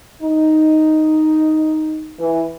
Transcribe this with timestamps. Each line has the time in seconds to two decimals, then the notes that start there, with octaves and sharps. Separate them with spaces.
0.22 D#4
2.19 E3